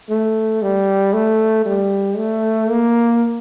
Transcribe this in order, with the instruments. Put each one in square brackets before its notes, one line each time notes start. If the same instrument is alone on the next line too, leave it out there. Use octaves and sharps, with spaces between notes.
[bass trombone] A3
G3
A3
G3
A3
A#3